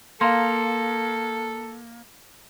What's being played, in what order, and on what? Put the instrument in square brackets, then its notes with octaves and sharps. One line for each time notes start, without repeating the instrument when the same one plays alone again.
[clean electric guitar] A#3 [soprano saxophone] A4 [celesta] F5 A#5 C6